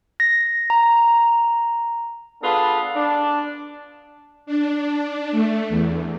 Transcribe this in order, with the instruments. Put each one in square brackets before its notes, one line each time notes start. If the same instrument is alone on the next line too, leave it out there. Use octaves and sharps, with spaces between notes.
[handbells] A#6
A#5
[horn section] B3 D4 F4 G#4 A4 B4
D4
[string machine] D4
D4
A3
E2